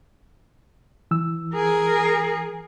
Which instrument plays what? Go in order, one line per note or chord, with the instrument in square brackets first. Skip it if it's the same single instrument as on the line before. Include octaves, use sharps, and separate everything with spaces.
[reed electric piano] E3 E6
[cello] G#4 A#4